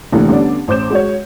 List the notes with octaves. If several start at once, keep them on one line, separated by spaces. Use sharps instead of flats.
F1 D2 D3 E3 A#3
D3 G3 B3 C#4 D4
A1 C5 D6 G6 E7
G#3 F#4 C#5